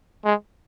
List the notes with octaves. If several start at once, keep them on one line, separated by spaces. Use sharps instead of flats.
G#3